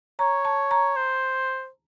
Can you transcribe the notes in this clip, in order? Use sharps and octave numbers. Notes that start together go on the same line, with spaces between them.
C#5 A#5
A5
A#5
C5